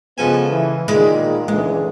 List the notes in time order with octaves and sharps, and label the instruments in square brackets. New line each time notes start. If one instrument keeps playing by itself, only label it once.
[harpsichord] C#2 A4 G#5 [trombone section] F3 G#3 B3
[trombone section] E3
[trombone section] A#2 D#3 [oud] G#3 [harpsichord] D5 B5
[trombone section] C#2 D3 E3 [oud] G#3